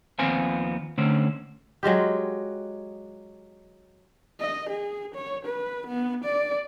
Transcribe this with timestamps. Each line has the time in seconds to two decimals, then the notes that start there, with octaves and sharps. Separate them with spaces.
0.19 D#2 F3 B3 C4 F4 G#5
0.98 D3 A3 C4 C#4
1.83 F#3 G#3 F4 G4
4.40 D#5
4.69 G#4
5.15 C#5
5.45 B4
5.87 B3
6.25 D5